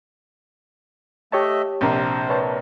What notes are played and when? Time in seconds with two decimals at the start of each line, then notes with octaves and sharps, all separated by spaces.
1.32 A3 G4 C#5 D#5 E5 A5
1.81 A#1 C3 A#3 C5
2.29 B4 C#5 A5